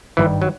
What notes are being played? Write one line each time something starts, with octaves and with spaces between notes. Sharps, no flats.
G#1 G2 D#3 E3 G3
F#3